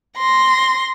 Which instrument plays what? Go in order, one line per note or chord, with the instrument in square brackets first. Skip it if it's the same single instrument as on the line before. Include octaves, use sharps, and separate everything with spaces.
[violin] C6 A#6